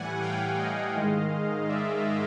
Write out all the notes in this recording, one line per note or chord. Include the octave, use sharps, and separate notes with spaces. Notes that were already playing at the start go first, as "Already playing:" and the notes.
Already playing: A2 E3 G3 F#5 G#5
F5 G5
D#5 F5
G#2 D#3 G#3
D5 E5